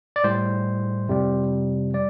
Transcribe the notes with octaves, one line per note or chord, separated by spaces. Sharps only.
D5
A2 G3 C5
F2 C3 G3
G3 D5